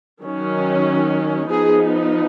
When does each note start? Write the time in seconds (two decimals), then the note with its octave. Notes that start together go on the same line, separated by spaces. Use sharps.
0.23 D#3 F#3 C#4
1.50 F3 B3 D#4 G#4